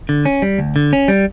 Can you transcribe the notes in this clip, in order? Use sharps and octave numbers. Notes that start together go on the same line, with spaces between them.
D3
C#4
G3
D2
D3
C#4
G3